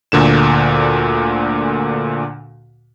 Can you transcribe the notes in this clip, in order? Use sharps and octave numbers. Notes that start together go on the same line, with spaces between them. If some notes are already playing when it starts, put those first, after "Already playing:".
D2 A#2 D3 E7